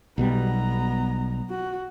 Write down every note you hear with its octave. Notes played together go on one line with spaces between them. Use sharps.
B1 B2 G3 B3 A#5
F#4